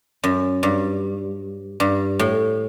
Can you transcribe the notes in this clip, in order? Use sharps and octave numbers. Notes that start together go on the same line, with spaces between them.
F#2
G2
G2
A2